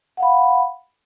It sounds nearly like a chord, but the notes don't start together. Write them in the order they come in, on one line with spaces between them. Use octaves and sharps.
F#5 F5 B5